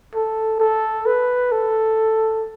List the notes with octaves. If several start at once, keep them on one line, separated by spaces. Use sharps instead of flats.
A4
A4
B4
A4